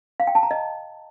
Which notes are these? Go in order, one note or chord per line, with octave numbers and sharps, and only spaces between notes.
F5
G5
A5
A#5
D#5